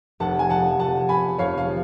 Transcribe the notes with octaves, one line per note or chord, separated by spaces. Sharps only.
F1 F#5 A5
G#5
F3 F#5 A5
F1 F#5 A5
F1 G#5 B5
F1 C#5 F5
F5
F3